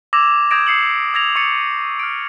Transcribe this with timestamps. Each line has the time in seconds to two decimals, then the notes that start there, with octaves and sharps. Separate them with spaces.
0.13 D6 E6 G#6 A#6 E7 F7
0.51 D#6 G6 G#6 A#6 D7 E7
0.67 D#6 C7 C#7 F#7
1.14 E6 G#6 A#6 F7
1.35 C#6 D#6 E6 A6 C#7
1.99 F6 D7